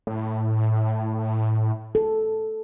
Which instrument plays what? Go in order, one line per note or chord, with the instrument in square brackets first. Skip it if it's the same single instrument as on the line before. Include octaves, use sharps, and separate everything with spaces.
[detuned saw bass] A2
[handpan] A4